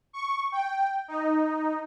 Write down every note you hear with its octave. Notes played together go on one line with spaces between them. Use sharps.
C#6
G5
D#4